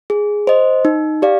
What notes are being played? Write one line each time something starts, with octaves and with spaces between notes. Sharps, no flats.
G#4
C5 D#5
D#4
G4 D5 F5